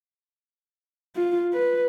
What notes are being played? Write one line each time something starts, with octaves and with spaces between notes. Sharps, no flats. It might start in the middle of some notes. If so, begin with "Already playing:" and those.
F4
B4